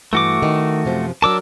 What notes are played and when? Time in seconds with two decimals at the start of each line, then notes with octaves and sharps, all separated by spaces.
0.13 G2 E3 A3 F#4 D6
0.43 D#3
0.85 F#2 C3 F3
1.22 F#3 D4 A#4 A5 D6 E6